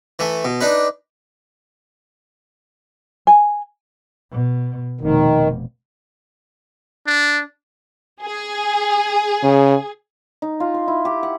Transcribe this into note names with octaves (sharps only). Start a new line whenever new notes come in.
E3 A3
B2
D4 D#4 B4
G#5
B2
F1 B2 D#3
D4
G#4
C#3
D#4
F4
C6
E4
G4
F#5